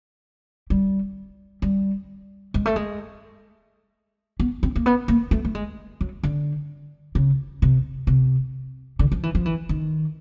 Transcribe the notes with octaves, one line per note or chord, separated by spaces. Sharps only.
G3
G3
G#3
A3
G#3
B3
C4
A#3
B3
A#3
A3
A3
G#3
F#3
D3
C#3
C3
C3
D3
F3
E3
F3
E3
D#3